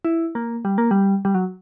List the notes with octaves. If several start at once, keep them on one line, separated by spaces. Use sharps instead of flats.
E4
A#3
G3
A#3
G3
G3
F#3